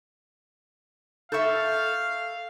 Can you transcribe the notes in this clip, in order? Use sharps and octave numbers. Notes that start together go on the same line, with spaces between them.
A4 E5 F5 C#6 G6